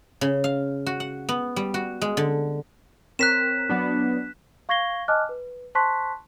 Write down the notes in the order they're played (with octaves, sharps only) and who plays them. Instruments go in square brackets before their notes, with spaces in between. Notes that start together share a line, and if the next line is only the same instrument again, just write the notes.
[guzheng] C#3
F5
F#4
F#5
B3
G3
F#4
G#3
D3
[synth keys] C4 A#4 C#5 [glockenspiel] F#6 B6 E7
[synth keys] F#3 B3 D4
[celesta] F5 C#6 G#6 A#6 C7 G7
D#5 G#5 A5 D6 F6 F#6
B4
C5 A5 C6 C#6 F#6 B6